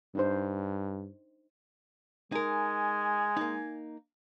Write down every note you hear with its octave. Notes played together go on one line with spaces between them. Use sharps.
G2 D4 D#4 C5
G#3 D#4 A#4 G#5
A#3 D#4